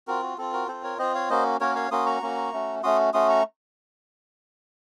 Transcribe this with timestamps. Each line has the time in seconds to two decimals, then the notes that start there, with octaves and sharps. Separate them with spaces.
0.07 C4 F4 F#4 A#4
0.22 F#4
0.38 C4 F4 A4
0.53 F#4 A#4
0.68 C4 F4 A4 C5
0.84 A#4 C#5
0.99 C4 F4 C5 D#5
1.15 C#5 F5
1.30 A#3 C#4 F#4 C5 D#5
1.61 A#3 C#4 F#4 A#4 C#5
1.75 C#5 F5
1.91 A#3 C#4 F#4 C6 D#6
2.06 A#5 C#6
2.22 A#3 C#4 F#4
2.53 A3 C#4 F#4
2.83 A3 C#4 F#4 C6 D#6
3.13 A3 C#4 F#4 C6 D#6
3.29 A#5 C#6